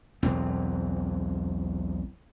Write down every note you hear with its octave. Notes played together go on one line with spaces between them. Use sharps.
B1 E2 C4